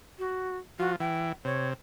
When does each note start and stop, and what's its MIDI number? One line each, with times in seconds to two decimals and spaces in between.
0.19 0.58 66
0.79 0.96 53
0.79 0.92 66
1.00 1.32 52
1.00 1.30 79
1.45 1.74 48
1.45 1.69 73